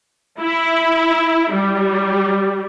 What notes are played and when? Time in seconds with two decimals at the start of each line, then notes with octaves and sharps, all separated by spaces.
0.40 E4
1.53 G3